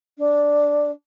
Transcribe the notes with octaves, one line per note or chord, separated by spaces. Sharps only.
D4